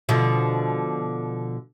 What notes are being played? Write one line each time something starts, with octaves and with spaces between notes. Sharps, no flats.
B2 D3 F3